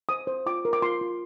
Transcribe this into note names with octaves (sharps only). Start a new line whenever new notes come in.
C5 D#6
C5
F4 D6
A#4
D6
F4 C6
F4